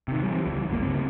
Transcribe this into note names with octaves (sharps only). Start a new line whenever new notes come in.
C3 D#3
E3 G3
C#2 E3
G1 A#3
C#2 C#3 C4